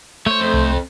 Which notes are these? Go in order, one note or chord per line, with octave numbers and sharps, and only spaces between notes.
A3 C5 C#5
F2
C2